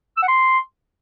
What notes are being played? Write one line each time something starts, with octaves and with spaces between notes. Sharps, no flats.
E6
F#5
C6